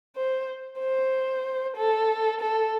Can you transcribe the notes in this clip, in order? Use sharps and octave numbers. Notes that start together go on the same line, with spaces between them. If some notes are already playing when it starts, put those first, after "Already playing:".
C5
C5
A4
A4